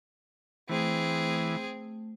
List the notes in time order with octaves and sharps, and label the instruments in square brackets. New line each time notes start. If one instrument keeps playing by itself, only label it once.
[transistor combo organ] E3 [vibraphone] A3 [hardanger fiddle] C4 G#4